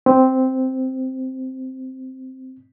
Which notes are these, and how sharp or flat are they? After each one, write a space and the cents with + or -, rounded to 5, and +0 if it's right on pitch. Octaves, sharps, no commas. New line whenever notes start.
C4 -5